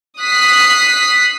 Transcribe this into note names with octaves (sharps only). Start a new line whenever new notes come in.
D#6 F#6 B6 C7